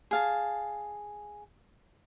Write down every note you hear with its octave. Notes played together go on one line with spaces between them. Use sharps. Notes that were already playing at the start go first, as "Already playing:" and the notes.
G#4 F5 A5